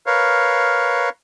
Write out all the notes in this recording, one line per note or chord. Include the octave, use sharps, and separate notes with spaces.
A#4 B4 C#5 F5